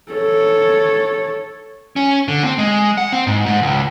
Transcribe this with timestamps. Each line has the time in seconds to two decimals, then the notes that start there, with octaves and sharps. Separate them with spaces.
0.12 A4 C#5
1.96 C#4
2.28 D3
2.44 C4
2.58 G#3
2.98 F#5
3.13 C4
3.27 G#2
3.46 G#2
3.62 C#2